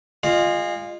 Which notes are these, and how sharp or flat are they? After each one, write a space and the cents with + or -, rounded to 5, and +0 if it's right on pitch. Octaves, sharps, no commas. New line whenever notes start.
G#3 -30 F4 +0